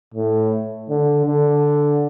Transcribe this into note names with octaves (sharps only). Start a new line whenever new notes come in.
A2
D3
D3